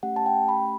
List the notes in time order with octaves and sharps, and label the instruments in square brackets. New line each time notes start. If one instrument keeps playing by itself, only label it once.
[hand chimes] A3 C#4 G4 F#5
A5
G5
B5